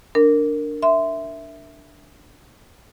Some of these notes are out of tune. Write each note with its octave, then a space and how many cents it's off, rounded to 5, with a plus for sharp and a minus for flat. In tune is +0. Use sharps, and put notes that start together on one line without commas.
D4 +0 A#4 -10
E5 +0 C6 -20